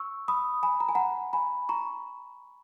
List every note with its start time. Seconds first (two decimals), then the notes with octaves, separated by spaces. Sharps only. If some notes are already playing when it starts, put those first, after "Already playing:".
Already playing: C#6 E6
0.28 B5 D#6
0.63 G#5 B5
0.80 A#5
0.89 G#5
0.95 F#5 A#5
1.33 G#5 B5
1.69 A#5 C#6